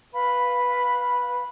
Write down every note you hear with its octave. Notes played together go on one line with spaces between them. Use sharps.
B4 F5 B5